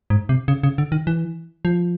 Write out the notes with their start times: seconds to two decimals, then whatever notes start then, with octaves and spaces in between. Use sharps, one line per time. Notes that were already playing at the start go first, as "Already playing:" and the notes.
0.10 G#2
0.29 C3
0.48 C#3
0.63 C#3
0.78 D3
0.92 D#3
1.07 E3
1.65 F3